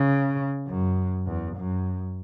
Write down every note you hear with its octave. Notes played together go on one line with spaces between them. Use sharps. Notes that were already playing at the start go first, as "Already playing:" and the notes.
Already playing: C#3
F#2
E2
F#2